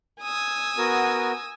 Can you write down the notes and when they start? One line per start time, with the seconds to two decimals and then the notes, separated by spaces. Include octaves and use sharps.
0.21 G#5 D#6 E6
0.78 B3 F#4 A#4